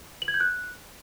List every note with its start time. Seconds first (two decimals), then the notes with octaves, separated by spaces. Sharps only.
0.22 F#7
0.28 G#6
0.34 G6
0.40 F#6